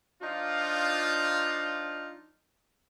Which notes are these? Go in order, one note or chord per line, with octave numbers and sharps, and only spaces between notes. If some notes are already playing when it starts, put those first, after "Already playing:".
F3 D4 D#4 F4